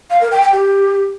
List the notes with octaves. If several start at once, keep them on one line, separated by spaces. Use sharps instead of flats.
F5
A#4
G5
G5
G4